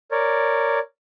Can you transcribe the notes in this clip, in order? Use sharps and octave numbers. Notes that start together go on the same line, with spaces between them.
A#4 C#5 D5